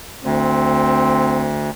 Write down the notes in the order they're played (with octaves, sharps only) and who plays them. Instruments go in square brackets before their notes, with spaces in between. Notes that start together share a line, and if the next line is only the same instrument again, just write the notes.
[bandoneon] D2 [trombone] C4